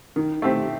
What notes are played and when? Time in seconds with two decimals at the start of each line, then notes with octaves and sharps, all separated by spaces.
0.16 D#3
0.42 A3 C4 G4